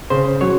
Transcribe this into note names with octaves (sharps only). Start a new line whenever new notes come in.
C#3 C5
F#3 C#5